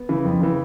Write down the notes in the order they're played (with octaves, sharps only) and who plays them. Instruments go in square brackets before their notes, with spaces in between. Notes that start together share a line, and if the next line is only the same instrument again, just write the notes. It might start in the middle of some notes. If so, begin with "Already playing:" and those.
Already playing: [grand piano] B3
C#3 E3
F2
C#3 E3